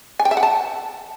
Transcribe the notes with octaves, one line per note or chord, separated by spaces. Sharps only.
G#5
G5
E5
F#5
A5